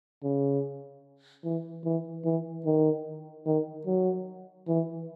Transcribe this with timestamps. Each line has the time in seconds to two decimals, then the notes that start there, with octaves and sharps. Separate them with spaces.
0.23 C#3
1.44 E3
1.84 E3
2.25 E3
2.65 D#3
3.46 D#3
3.86 F#3
4.68 E3